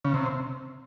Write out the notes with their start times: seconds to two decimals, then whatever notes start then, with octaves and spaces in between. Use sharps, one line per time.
0.05 C#3
0.14 C3